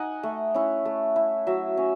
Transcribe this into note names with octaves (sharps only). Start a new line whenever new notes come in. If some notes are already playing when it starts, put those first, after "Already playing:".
Already playing: D#4 F#5 G#5
A3
C#4 E4
A3
E4
F#3 E5
C#4